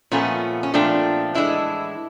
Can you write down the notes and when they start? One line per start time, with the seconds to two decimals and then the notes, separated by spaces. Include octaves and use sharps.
0.11 A#2 F3 A3 B3 C#4
0.63 C#4
0.74 A#2 F3 A3 C4 D4
1.34 A2 E3 G#3 D4 E4